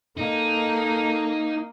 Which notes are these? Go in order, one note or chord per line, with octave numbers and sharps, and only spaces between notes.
A#3 D#4 A4